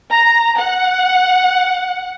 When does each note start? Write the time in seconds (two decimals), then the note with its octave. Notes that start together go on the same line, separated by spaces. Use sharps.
0.13 A#5
0.57 F#5